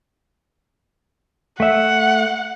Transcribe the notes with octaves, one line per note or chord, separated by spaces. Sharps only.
A3 E5 F#5